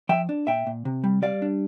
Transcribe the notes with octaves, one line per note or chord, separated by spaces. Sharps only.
F3 E5 G5
D4
A#2 E5 G5
A#2
C3
G3
G3 D5 F5
D4